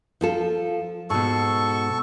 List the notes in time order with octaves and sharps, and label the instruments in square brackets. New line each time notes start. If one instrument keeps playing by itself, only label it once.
[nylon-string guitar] F3 F4 A4
[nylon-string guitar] G#2 B2 [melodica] A4 C#6